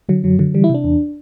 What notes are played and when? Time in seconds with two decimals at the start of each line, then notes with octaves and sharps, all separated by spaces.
0.09 D3 F#3
0.24 F#2 F#3
0.39 D3 F#3
0.54 E3 G3
0.64 E4
0.70 C3 D4
0.84 E2